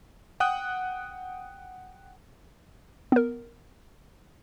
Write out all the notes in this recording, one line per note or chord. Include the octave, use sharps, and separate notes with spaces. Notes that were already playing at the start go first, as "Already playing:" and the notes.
F#5 G5 D#6 F#6
B3 A#4